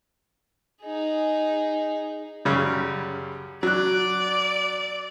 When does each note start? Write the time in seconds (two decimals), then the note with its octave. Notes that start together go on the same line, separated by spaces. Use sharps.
0.82 D#4 G#4
2.45 F#2 C#3 G3
3.63 F#3 D5 F#6